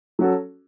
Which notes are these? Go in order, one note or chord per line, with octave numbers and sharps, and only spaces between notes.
F#3 C#4 F#4 A4